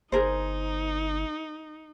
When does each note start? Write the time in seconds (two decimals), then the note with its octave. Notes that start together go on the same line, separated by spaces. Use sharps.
0.12 G1 D#4 G#4 A#4 C5